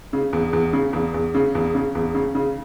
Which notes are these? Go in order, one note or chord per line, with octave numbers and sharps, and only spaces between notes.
C#3
E2
E2
C#3
E2
E2
C#3
E2
C#3
E2
C#3
C#3